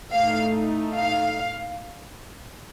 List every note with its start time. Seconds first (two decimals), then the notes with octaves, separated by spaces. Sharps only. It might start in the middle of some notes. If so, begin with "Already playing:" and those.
0.12 A2 A3 D#4 F5
0.94 F5